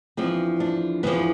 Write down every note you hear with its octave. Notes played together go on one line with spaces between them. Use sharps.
E2 D3 F3 C4
D4
E2 D3 F3 B3